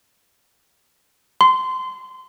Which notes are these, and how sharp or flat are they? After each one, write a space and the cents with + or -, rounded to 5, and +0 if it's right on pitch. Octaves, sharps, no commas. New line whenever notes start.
C6 -20